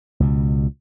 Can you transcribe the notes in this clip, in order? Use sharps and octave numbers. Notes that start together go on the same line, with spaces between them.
C#2 B2